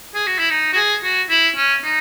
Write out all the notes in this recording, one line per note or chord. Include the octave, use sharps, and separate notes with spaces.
G#4
F#4
E4
D#4
F#4
G#4
F#4
E4
C#4
D#4